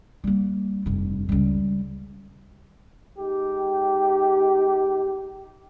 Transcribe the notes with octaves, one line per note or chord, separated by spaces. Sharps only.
G3 A#3
F1 G2
C#2 G3
G#3 D#4 G4